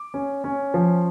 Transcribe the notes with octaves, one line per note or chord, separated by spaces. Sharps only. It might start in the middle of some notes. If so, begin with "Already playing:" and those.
Already playing: D6
C#4
C#4
F3